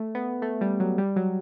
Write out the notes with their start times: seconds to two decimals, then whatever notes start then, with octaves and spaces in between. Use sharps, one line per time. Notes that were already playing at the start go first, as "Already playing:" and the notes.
Already playing: A3
0.15 B3
0.42 A3
0.61 G3
0.80 F#3
0.98 G3
1.16 F#3